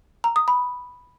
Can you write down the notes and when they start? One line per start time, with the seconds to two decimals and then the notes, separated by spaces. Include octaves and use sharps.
0.24 A#5
0.36 D#6
0.48 B5